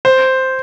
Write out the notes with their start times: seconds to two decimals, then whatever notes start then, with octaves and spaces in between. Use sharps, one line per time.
0.05 C5